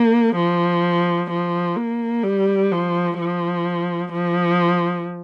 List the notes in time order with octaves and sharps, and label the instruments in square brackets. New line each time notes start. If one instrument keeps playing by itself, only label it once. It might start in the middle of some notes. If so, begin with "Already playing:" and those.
Already playing: [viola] A#3
F3
F3
A#3
G3
F3
F3
F3